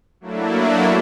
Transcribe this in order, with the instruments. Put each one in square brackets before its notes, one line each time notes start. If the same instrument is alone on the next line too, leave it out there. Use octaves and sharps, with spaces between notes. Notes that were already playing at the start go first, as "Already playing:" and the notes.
[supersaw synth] F#3 A3 A#3 D4 E4